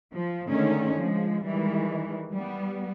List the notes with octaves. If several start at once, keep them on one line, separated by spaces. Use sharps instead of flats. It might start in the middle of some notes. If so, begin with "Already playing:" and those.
F3
D3 D#3 G#3 A3 C#4 D#4
F3 G#3
D#3 E3 G3 G#3
G3 B3